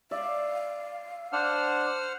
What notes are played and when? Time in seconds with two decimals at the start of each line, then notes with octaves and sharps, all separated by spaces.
0.11 D5 E5 F5
1.32 D4 C5 F#5 F6